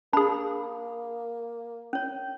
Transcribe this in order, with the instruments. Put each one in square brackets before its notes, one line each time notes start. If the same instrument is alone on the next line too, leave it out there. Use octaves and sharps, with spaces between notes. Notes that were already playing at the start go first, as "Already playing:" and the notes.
[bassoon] A#3 [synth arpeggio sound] D4 G#4 [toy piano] B5
[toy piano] C#4 C#5